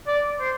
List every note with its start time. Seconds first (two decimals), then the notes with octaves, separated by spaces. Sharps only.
0.07 D5
0.40 C5